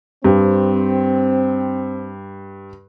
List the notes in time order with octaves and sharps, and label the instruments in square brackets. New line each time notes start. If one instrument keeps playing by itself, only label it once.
[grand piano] G2 [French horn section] C4